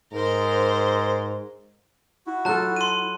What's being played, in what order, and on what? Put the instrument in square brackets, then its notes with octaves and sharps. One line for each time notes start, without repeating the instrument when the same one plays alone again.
[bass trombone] G#2 [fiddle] A#4 C5
[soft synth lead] E4 [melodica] F#4
[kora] F#3 F4 A4 [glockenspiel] A5 F#6
[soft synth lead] E4 [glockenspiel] C6 D#7